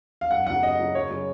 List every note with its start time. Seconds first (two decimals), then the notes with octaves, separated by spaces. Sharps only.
0.21 F5
0.31 F#2 F#5
0.47 C#3 F#3 F#5
0.62 F#2 D#5
0.78 C#3 F#3
0.94 F#2 C#5
1.10 C#3 F#3